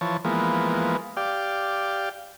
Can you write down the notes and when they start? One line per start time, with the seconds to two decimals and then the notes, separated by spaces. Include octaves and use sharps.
0.01 E3 F3 C#5 A5
0.25 E3 F3 G#3 A#3 B3
1.17 G4 D5 F5 G5